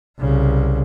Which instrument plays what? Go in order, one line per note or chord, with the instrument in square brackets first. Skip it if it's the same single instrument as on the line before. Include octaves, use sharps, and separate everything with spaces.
[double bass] C2 C#3